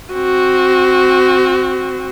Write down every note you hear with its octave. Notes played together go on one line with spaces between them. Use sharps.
C4 F#4